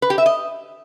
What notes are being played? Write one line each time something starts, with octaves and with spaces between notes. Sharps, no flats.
B4
G4
E5
D#5